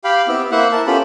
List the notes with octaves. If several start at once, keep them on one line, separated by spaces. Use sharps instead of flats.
G4 F5 G5 B5
B3 C4 E4 G4
A#3 E4 C5 E5 F#5
A#4 A5
B3 C#4 F4 G4 A4 B5